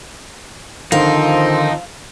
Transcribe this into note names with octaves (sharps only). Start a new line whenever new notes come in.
D3 D#3 F3 C4 D#4 F5